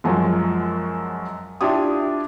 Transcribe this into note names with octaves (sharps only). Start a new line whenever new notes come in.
F#2 F3 F#3 G#3
D4 E4 F4 G4 D#6